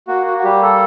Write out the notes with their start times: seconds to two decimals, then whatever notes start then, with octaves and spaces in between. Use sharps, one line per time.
0.08 A#3 F#4
0.26 F#4
0.38 F#4
0.44 G3 G4
0.62 A4